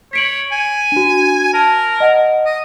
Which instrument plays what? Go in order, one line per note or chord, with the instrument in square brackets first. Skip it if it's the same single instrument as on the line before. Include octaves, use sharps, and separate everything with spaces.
[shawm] C#5 [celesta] B6 D7 F#7
[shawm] G#5
[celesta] D4 F#4
[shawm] A#4 [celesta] A5
[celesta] D#5 F#5
[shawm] D#5